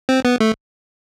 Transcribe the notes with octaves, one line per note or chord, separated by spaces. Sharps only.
C4
B3
A3